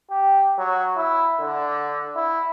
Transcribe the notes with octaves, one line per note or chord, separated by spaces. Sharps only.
G4
F#3
E4
D3
E4